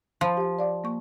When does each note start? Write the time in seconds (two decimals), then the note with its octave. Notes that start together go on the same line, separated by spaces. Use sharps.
0.21 F3 C5 A5 B5
0.37 G4 F5
0.59 D5 F5 D6
0.84 A#3 C#6